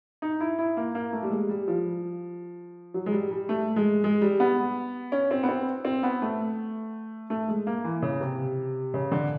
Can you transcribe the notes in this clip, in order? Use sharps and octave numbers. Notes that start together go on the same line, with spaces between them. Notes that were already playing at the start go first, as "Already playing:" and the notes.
D#4
E4
E4
A#3
A#3
A3
G3
G#3
G3
F3
F#3
G#3
G3
G3
A3
G#3
G#3
G3
B3
C#4
C4
B3
C4
C4
B3
A3
A3
G#3
A#3
E3
C#3
C3
C#3
D3